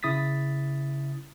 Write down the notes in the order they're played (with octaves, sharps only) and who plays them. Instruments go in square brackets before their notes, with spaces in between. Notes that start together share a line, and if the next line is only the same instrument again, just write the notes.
[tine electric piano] C#3 E4 D#6 A6 B6